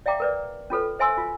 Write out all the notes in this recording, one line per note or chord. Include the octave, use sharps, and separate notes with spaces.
D5 E5 F5 G5 A#5 D6
A#4 B4 D5
C#4 F4 A4 B4
C5 E5 G#5 C6 E6
F4